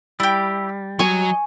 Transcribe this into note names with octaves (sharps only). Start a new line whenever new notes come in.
G3 E4 G4
F#3 D#5 G#5 C#6